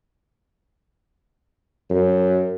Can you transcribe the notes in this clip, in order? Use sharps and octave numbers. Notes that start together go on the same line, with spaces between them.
F#2